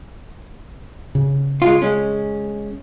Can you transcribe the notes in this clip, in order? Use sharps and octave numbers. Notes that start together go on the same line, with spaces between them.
C#3
G#3 F4
G#3 C#4